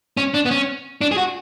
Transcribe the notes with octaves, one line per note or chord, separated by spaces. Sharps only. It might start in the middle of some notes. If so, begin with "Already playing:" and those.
C#4
D4
B3
C#4
D4
G#4
F#4